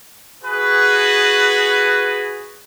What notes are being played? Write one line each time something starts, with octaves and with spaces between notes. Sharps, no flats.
F#4 G#4 B4